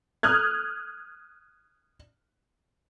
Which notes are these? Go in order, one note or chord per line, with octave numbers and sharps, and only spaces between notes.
D#6 F6 F#6 G#6